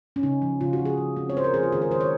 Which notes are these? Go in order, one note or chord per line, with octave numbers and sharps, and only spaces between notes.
C#4
C#3 D#4
F3
C#3 F4
F#4
F3
G#4
F3
C4
C#5
C4 C5
A#4
F3 G#4
F4
D#3 G#4
A#4
D#3 C5
C#5